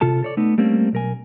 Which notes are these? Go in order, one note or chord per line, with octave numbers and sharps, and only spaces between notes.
C3 F4 A4 A5
A4 C#5 D5
A3 B3 D#4
G3 A3 A#3 C4 C#4
B1 A#4 G#5